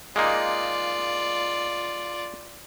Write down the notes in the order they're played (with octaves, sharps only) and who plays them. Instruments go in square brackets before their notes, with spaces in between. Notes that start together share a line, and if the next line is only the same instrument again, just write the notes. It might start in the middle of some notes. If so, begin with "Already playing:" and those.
[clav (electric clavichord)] G#3 A#3 D#4 [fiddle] F4 D5